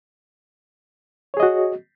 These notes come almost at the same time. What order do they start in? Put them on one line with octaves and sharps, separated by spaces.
C#5 G#4 D#5 F#4